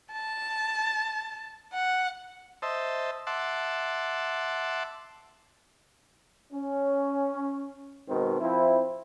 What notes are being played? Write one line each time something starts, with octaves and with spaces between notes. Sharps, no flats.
A5
F#5
C5 D#5 E5 A5
E5 F#5 A5 C6 D6
C#4
G#2 B2 D#3 C4
F3 C4 E4